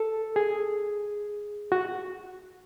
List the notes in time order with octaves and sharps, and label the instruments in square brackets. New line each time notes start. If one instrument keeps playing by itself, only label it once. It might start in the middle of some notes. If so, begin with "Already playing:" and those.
Already playing: [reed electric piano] A4
G#4
F#4